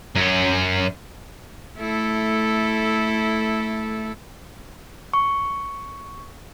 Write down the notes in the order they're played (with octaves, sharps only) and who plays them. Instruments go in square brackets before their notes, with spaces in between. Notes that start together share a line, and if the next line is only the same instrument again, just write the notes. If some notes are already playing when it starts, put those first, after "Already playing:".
[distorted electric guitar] F#2 C#4
[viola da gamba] A3 E4 A4
[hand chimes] C#6